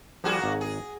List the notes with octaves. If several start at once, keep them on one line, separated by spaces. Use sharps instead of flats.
F3 G3 A#3 F#4 G#4
G#1 F#5 A#5
G#4